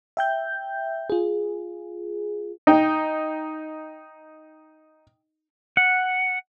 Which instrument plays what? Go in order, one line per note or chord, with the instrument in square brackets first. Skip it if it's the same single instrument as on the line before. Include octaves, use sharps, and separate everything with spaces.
[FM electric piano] E5 G5 G6
F4 G#4
[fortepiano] D#4 G5
[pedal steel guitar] F#5